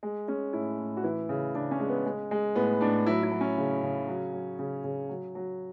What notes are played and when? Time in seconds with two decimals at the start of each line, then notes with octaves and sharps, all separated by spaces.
0.03 G#3
0.28 G#3 C#4
0.53 A2 E4
0.79 A2
0.97 F#4
1.03 E3 E4
1.29 C#3
1.55 C#3 D4
1.71 C#4
1.80 G#3
1.88 B3
2.06 G#3
2.31 G#3
2.55 A2 B3
2.81 A2 D4
3.06 F#3 E4
3.23 E4
3.32 F#3
3.41 C#4
3.58 C#3
3.83 C#3
4.08 F#3
4.33 F#3
4.59 C#3
4.84 C#3
5.09 F#3
5.35 F#3